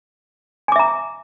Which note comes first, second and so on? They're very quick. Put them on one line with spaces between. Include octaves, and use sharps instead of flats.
G#5 D6 E5 A#5